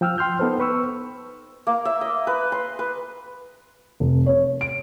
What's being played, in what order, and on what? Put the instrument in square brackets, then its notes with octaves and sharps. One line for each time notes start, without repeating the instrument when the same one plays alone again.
[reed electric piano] F3 G5 E6 F6
G5 C6 F6 G6
B3 D#4 A4 B4 C5
B4 C#6 E6
[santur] A#3
E5
D#5
B4
C6
B4
[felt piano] F1
C#5
D7